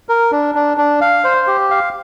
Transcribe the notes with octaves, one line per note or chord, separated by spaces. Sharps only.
A#4
D4
D4
D4
F5
C5
G4
F5